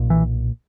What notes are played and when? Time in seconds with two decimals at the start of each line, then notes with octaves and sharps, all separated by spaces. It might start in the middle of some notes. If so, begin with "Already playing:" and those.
Already playing: B1 A#2
0.10 E3